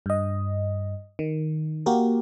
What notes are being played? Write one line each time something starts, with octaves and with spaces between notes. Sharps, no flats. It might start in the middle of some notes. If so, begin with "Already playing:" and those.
G2 D#5
D#3
A#3 F#4 G4 A#4